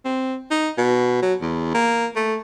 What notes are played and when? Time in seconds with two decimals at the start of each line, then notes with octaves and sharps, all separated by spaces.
0.05 C4
0.51 D#4
0.78 B2
1.22 F#3
1.41 E2
1.74 A#3
2.16 A3